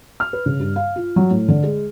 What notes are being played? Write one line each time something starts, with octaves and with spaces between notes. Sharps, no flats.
F6
B4
C#3
G2
F5
F4
F#3
A2
D3
G#3